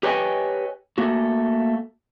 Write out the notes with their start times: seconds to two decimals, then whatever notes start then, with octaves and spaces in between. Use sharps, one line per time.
0.03 G4 B4 C#5 D#5 G5 G#5
0.98 A3 A#3 F#4